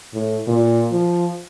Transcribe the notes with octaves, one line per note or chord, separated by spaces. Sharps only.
A2
A#2
F3